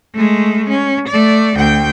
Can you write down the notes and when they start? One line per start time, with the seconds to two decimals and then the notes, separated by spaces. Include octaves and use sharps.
0.14 G#3 A3
0.69 C#4
1.09 A3 D5
1.57 D2 G5